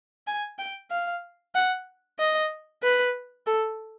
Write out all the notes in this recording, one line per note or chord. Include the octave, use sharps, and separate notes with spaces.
G#5
G5
F5
F#5
D#5
B4
A4